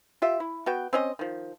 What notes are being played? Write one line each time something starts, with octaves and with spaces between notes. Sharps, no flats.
F4 G4 E5
E4
B3 F#4 G5
C4 C#4 D#5
D#3 F3